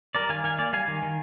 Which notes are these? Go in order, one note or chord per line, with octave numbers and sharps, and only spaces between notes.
G3 A#4 D5
D#3 F5 G#5
D#3 F5 G#5
A#3 D5 F5
G3 F5 G#5
D#3
D#3